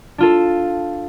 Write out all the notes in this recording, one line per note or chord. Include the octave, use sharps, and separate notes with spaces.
D4 F4 A4